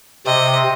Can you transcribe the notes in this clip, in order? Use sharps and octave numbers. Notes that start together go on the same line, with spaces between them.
C3 D#5